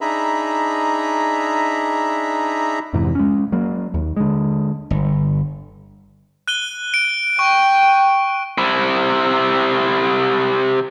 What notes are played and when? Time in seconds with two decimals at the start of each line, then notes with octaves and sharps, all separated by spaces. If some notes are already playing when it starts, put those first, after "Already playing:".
0.01 D4 D#4 G#4 E5 A#5 B5
2.93 F2 G#2 C3 E3
3.15 G#3 C#4
3.52 F#3 A#3
3.94 D#2
4.17 D3 G#3
4.91 G1
6.48 F#6 D#7 G7
6.94 D7
7.39 G5 C#6
8.58 C3 E4